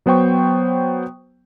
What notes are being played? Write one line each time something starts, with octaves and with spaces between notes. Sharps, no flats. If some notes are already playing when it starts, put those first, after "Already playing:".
F#3 B3 C5 G5 C#6